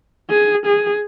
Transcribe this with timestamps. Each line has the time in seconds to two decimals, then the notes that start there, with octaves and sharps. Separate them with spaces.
0.30 G#4
0.66 G#4